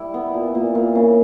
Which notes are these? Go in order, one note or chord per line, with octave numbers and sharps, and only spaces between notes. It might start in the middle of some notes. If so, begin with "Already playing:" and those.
Already playing: G3 E4
B3
A#2
A#2
A#2
C#3